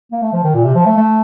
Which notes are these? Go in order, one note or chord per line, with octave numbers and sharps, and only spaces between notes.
A#3
A3
F3
D#3
A#2
C3
F3
A3
A3